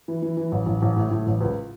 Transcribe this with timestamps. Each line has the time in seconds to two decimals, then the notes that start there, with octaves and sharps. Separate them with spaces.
0.08 E3
0.22 E3
0.37 E3
0.52 A1
0.66 A1
0.82 A1
0.96 A2
1.11 A2
1.26 A1
1.41 C#2